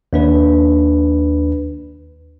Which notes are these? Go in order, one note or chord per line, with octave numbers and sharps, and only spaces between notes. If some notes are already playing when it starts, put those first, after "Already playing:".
D#2 D4 B4